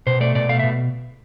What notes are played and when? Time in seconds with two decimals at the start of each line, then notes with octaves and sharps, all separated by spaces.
0.07 B2 C5
0.21 A3 D5
0.35 B2 D5
0.49 A3 F5
0.59 B2 E5